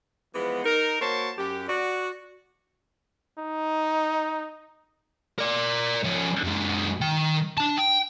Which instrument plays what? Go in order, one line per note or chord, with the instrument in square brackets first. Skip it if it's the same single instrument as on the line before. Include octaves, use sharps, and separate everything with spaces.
[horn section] E3 F3 G#3 B3
D#4 A#4
A#3 F#4 C5 C#5 A5
F#2 G4
F#4 D5
[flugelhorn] D#4
[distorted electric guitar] A#4 D5
F3 C#4
F#2 G#3
D#3 G5
D4 A5
G5